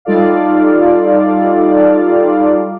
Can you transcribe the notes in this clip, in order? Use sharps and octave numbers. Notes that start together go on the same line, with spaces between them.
G3 D#4 F4 A4 D5 F5